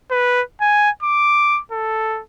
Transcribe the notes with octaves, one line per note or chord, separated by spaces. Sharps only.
B4
G#5
D6
A4